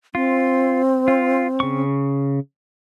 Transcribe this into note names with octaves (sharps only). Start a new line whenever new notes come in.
C4 F4
F4
C#3 C#6